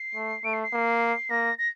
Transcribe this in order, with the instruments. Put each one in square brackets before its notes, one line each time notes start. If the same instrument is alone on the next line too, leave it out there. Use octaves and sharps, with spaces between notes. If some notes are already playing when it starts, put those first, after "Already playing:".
Already playing: [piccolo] C7
[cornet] A3
[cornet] A3 [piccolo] D7
[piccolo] C7
C7
[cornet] A#3
[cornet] A#3 [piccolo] A#6
[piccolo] A#6